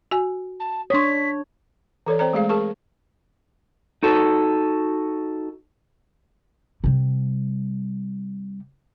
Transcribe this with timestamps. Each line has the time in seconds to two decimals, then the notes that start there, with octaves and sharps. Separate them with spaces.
0.11 F#4 G#5
0.59 A5
0.90 D4 C#5 C6 D#6 B6
2.06 E3 A4 C#5 D5
2.19 C4 C5 D5 A#5
2.33 G#3 A3 G#4 F5
2.49 G#4 A#4 A5 C#6
4.03 D#4 F#4 A4
6.84 C3 G3